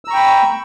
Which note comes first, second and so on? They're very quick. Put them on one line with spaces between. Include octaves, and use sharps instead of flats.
E6 A#5 C#6 G5 B5